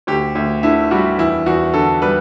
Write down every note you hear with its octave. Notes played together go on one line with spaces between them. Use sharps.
D2 G4
D2
D3 E4
G3 F#4
E2 E4
E2 F#4
D3 A4
G3 B4